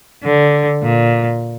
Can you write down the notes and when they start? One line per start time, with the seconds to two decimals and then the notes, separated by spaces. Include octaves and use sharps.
0.24 D3
0.83 A#2